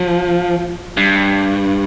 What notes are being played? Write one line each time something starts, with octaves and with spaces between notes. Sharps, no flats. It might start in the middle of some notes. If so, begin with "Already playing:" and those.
Already playing: F3
G2